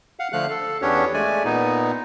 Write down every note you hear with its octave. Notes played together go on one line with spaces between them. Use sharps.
F5 F#5
D3 F3 A3 F5 F#6
A4
E2 B3 C#4 D4 G4 C#5
G#3 A3 D5 G#5
A#2 B3 D#4